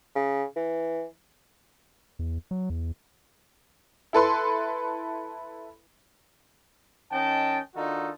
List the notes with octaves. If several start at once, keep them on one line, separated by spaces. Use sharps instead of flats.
C#3
E3
E2
F#3
E2
E4 A4 B4 C6
D#3 C#4 D#5 G5 A5
D#3 D4 D#4 F4 F#4 A4